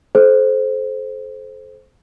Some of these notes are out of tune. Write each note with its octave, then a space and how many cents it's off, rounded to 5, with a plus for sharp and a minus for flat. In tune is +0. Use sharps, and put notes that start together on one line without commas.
A4 -35 C5 +0